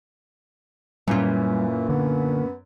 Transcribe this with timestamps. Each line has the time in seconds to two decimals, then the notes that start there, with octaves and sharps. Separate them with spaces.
1.08 F#2 A#2 E3 G3 C#4 F4
1.89 D3 B3